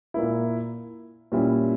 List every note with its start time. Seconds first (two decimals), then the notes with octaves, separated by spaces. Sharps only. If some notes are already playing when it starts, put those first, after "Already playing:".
0.14 A#2 A#3 E4
1.32 A#2 G3 C#4 E4